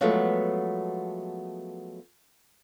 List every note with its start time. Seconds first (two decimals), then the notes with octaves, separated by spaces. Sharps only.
0.01 F3 F#3 G#3 A3 B3